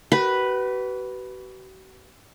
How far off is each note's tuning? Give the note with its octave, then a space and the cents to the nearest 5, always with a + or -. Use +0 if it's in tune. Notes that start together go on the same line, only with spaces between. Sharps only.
F#4 +45 B4 +0